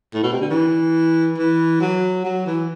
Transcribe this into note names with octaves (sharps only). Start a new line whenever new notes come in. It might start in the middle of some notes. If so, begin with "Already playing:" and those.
A2
B2
C3
D3
E3
E3
F#3
F#3
E3